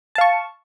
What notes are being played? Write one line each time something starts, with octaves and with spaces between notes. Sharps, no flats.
F5 A5 C#6